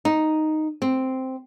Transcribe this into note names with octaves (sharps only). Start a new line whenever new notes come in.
D#4
C4